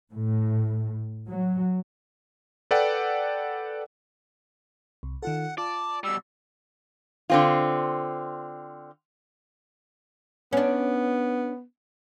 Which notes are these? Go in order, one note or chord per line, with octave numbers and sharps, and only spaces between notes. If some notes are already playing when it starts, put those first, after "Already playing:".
A2
F#3
A4 B4 D5 F#5 G5
C2
D#3 F4 A4 F#5
F4 D5 A5
B2 G3 E6
D3 C4 F4
B3 C#4 D4